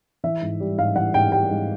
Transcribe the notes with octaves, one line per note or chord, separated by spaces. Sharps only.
E3 E5
G#2
G3
G#2 F5
E3 F#5
G#2 G5
G3 G5
G#2